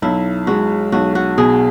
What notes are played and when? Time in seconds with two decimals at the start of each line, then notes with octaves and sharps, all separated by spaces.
0.02 B1 E4
0.47 G#3 F#4
0.92 B1 F#4
1.15 F#4
1.38 B2 G#4